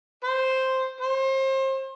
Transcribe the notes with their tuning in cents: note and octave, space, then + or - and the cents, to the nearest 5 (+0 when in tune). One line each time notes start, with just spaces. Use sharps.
C5 +0
C5 +35